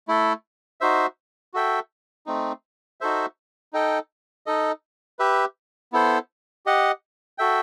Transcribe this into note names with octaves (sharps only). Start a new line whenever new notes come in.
A3 E4 A4
D#4 F#4 C5 E5
F#4 A4 E5 G5
A3 C4 D#4
D#4 F#4 A4 C5 E5
D#4 A4 D#5 G5
D#4 A4 D#5
G4 B4 E5
B3 E4 A4 C5
G4 D#5 F#5
F#4 A4 E5 G5